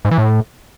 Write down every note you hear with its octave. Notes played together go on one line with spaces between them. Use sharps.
G#2
E3
A2